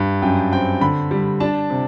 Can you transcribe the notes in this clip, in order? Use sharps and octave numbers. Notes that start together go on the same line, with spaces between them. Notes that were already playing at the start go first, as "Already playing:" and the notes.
Already playing: G2
F#2 G5
C4 G5
D3 B5
G3
D4 A5
C3